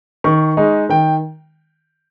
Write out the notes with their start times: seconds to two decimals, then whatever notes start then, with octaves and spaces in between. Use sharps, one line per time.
0.24 D#3 C#6
0.57 G#3 D#4
0.89 D#3 G5